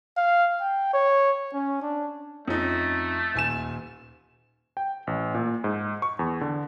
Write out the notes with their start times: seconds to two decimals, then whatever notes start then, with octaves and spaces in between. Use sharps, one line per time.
0.17 F5
0.60 G5
0.93 C#5
1.53 C#4
1.82 D4
2.48 F2 A3 C#4 D#4
3.35 D#1 G#5 E7
4.77 G5
5.07 A1
5.34 A#2
5.64 G#2
6.02 C#6
6.19 E2
6.41 D3